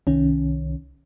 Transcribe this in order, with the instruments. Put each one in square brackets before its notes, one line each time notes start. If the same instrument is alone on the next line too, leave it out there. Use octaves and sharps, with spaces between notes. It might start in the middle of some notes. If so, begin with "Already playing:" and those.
[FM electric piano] C2 D#3 C#4